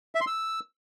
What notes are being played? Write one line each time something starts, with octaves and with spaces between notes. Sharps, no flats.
E5
C6
E6